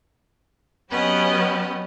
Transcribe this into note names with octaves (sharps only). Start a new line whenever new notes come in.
F#3 B3 C#4 G4 D#5